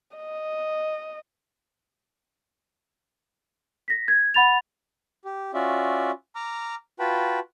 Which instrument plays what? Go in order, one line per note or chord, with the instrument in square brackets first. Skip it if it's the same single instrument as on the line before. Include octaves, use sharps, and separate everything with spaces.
[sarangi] D#5
[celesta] A#6 B6
G#6
F#5 B5 A6 F7
[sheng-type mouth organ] G4
C#4 F4 F#4 D5 E5
A#5 D6 F6
F4 F#4 B4 G5 A5 B5